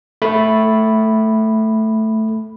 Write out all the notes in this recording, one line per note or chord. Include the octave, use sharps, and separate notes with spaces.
A3 B5